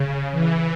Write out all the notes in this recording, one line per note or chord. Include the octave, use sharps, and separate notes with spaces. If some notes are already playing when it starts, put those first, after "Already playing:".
Already playing: C#3
E3